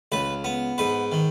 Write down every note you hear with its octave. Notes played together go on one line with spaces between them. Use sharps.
C#2 B4
B3
G#2 B4
D#3